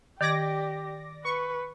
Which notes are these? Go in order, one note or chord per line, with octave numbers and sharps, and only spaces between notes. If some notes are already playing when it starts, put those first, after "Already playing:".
D#3 G4 D5 D6 G#6 A#6
B4 C#6